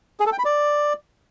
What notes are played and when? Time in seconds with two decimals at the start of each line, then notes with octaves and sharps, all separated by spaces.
0.20 G#4
0.26 A4
0.33 G5
0.39 B5
0.45 D5